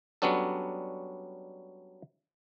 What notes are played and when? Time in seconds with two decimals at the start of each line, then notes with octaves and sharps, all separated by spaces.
0.22 F#3 G3 B3 C#4 D4 A4